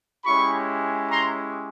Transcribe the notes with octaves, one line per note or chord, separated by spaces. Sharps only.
G#3 C#4 E4 G4 B5 C#6
A#5 C6